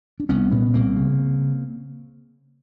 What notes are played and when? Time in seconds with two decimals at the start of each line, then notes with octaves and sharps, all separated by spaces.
0.20 D4
0.29 C2 B3 C#4
0.51 A#2 B3 C#4
0.74 C2 A#3 C4
0.97 C#3